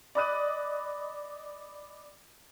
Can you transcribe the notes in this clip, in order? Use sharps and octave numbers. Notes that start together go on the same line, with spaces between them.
D5 D#5 B5 D#6 F#6 D#7